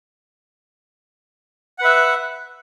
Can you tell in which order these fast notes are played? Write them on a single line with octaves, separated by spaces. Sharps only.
F#5 B4 E5